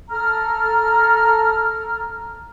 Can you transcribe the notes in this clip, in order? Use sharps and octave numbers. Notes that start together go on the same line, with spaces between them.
A4 A#5 F6